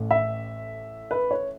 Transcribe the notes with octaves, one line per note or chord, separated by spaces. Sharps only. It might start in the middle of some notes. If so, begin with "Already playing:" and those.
Already playing: A1 A2 A3
E5
B4
C#5